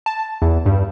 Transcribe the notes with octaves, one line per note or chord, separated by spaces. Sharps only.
A5
E2
G2